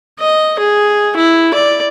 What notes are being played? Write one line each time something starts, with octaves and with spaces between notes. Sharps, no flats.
D#5
G#4
E4
D5